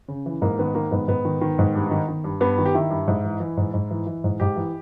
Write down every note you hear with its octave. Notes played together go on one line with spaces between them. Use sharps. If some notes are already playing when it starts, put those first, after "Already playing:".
C#3
E3
G#2 A#3
D#3 B3
D#3 A#3
G#2 B3
G#2 B3
D#3
D#3
G#2
G2
D#3
D#3
G2
G2 B3
D#3
G4
D#3 E4
G2
G#2
E3
E3
G#2
G#2
E3
E3
G#2
G#2 G4
E3